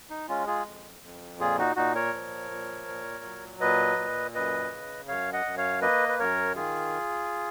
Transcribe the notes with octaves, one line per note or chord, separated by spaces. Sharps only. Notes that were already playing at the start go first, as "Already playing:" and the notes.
D#4
G#3 C#4 F4
F4 G#4
F2
F2
A#2 F4 G#4
D#4 F#4
A#2 D#4 F#4
A#4 C#5
F3
A#2
A#2
F#3
A#2 B4 D#5
A#2
F#2 B4 D#5
C#3
F#2 C#5 F5
D#5 F#5
F#2
C#5 F5
A#3 B4 D#5
B4
F#2 A#4 C#5
D#3 F4 G#4